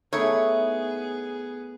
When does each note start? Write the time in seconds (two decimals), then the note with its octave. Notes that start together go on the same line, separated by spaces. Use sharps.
0.13 A3 B3 D#4 E4 G#4 C#5